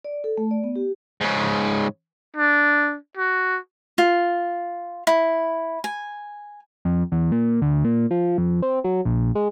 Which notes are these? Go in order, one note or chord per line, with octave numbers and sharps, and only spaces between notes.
D5
A4
A3
D5
B3
G4
G#2 C#3
D4
F#4
F4
E4
G#5
F2
E2
A#2
D2
A#2
F3
F2
C4
F#3
A#1
G#3